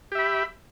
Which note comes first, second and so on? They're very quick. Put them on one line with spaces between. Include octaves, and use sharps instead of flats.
G4 E5 B5